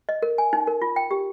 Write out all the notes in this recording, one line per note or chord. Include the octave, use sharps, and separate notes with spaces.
D#5
A#4
G#5
D#4
A#4
F4
G5
G4